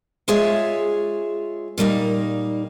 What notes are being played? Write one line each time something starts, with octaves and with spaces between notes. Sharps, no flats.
G#3 F4 G#4 C#5 E5
A#2 G3 A#3 D#4